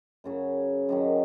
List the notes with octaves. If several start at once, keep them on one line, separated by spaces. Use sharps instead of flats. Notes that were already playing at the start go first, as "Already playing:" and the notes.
F#2 C#3 F#3
F#2 D#3 F#3